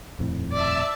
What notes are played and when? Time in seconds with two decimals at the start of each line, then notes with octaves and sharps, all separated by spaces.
0.19 D#1 F2 A2
0.52 D5 E5 A5 E6